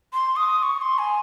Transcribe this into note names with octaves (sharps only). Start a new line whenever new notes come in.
C6
D#6
D#6
C#6
C6
G#5